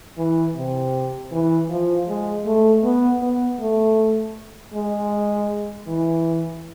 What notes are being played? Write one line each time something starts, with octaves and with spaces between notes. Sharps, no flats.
E3
C3
E3
F3
G#3
A3
B3
B3
A3
G#3
E3